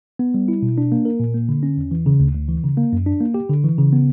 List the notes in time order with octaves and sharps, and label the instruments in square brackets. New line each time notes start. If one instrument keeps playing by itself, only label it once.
[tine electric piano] B3
G3
E4
B2
D4
A#3
A#4
A#2
A#3
D3
C#4
E2
E3
C#3
D2
D2
E3
C#3
A#3
F#2
D4
A#3
G4
D3
E3
C#3
B3